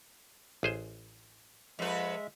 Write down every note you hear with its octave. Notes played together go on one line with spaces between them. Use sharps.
A1 G#4 C5
F2 G#3 B4 E5